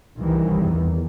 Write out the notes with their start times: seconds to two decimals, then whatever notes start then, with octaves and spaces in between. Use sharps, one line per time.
0.18 C2 D#3 E3
0.64 E2